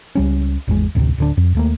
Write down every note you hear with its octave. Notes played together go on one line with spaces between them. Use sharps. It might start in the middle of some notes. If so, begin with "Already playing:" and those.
C#2 G3 C#4
G#1 E2 G#3
A1 D2 A2 C3
D1 D3 D4
F2
D#2 A3 A#3